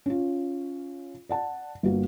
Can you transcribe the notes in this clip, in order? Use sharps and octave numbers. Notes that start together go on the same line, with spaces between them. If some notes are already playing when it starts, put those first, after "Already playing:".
C#4 F4
D5 F#5 A5
G1 A#3 F#4